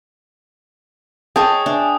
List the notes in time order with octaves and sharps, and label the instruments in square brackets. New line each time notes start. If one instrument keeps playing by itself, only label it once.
[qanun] G#4 C#5 D#5 [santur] G5 A5 [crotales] D#6
[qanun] D4 [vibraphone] E5 G#5